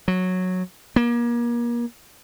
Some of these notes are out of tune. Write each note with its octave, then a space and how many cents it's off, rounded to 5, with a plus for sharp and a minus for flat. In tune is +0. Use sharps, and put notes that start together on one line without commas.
F#3 -10
A#3 +35